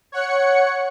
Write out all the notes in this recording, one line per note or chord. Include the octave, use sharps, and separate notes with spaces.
C#5 F#5 C#7